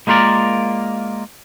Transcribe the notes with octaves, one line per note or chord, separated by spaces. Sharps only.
G#3 A#3 F4 A#4 D5